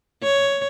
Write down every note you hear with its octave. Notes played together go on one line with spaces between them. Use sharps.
C#5